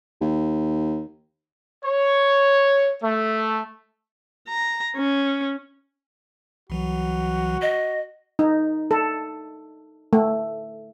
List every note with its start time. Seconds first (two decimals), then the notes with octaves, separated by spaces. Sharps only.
0.21 D#2
1.84 C#5
3.03 A3
4.48 A#5
4.97 C#4
6.70 C2 E3 F#3 F#4
7.62 D#5
8.39 D#4
8.91 A4
10.13 A3